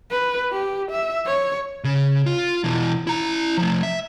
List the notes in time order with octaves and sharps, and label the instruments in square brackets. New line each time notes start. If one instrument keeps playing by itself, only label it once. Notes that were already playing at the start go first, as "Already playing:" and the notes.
[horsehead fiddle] B4
G4
E5
C#5
[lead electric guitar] C#3
F4
B2 E3
E4 A#5
F3 A3
E5